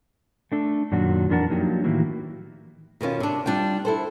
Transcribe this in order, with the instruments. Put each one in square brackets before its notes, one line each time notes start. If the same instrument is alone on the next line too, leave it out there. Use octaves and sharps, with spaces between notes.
[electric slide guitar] A3 D4 A4
F#2 A#2 D#3 F#3 D4 F#4
F2 E3 D4 A#4 F#5 A5
F3 F#3 A#3 D4 D#4 G4
A2 D#3 E3 A#3 E4 F#4
[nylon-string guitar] B2 D#3 C#4 F4
C3 D4
G3 D4 F4 G5
E4 A4 C5